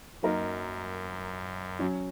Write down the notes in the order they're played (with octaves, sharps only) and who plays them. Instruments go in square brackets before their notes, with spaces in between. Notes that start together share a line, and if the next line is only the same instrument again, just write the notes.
[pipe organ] F#2 [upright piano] F#3 A#3 D#4 A#4 D#5
[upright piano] F#3 C#4 F#4